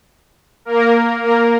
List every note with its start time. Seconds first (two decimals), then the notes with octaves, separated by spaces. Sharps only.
0.65 A#3 A#4
1.23 A#3 A#4